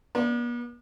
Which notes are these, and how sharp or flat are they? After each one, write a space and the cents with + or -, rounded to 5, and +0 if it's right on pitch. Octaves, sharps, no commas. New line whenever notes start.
B3 -45 D5 +0